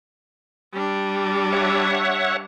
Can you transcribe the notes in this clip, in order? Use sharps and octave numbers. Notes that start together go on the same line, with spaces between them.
G3 D4
C#5 E5 F#5